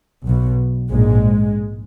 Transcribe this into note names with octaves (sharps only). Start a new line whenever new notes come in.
B1 B2
A#1 G#2 G#3